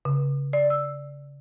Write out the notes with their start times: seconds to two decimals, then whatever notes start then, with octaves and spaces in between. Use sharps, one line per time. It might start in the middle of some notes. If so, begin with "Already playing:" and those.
0.05 C#3
0.53 D5
0.70 E6